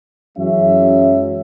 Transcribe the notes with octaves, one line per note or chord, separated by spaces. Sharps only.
F#2 E3 F#3 G#3 C#4 E5